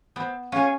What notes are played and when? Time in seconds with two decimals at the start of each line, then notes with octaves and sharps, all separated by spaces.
0.16 B3 C4
0.52 C#4 F4 G#4 C#5